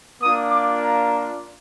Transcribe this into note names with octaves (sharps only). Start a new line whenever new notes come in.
A#3 D4 F4 D#6
D6
A#5